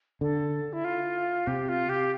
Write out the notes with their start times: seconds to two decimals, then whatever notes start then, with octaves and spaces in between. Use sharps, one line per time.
0.21 D3 A4
0.73 E4
0.85 F4
1.47 C3 G4
1.69 F4
1.89 G4